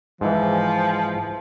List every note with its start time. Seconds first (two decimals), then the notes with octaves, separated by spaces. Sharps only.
0.21 G#2 E3 F3